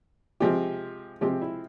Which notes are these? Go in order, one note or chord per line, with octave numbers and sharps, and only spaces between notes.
C3 F3 G#3 C4 G4
C3 F3 G#3 C4 G4
E4